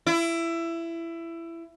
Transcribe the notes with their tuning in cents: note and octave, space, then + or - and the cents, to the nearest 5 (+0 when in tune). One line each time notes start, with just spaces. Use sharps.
E4 +20